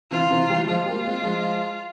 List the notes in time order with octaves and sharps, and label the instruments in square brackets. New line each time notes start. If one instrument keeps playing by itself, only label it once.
[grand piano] C3 E3 [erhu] F4
[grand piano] C3 E3
E3 G3
[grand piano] F3 G#3 [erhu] F4
[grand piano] G3 A#3
G#3 C4
F3 G#3